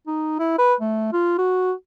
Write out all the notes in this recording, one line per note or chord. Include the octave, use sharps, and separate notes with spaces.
D#4
E4
B4
A3
F4
F#4